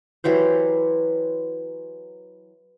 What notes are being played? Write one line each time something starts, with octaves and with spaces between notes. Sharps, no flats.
E3 F#3 G4 C5